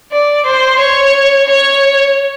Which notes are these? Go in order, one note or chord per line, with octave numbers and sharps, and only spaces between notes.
D5
C5
C#5
C#5